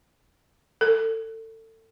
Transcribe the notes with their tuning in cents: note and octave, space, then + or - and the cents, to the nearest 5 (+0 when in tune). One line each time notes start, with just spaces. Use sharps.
A4 +30